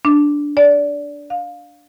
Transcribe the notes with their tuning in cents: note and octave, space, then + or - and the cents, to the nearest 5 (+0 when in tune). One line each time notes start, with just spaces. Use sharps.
D4 -5
D5 -20
F5 +20